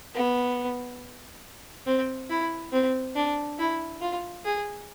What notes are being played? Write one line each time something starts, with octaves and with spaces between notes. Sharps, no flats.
B3
C4
E4
C4
D4
E4
F4
G#4